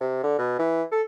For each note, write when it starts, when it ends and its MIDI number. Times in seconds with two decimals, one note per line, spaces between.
0.01 0.23 48
0.23 0.37 50
0.38 0.58 47
0.59 0.83 52
0.92 1.02 69